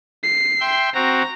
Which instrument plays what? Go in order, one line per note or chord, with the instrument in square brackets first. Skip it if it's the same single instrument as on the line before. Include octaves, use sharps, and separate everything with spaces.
[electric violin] C7
[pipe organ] E5 G5 C6
[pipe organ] C4 F#4 [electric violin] A#5